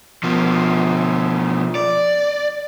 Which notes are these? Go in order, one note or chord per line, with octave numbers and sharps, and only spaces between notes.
B2 F3
D5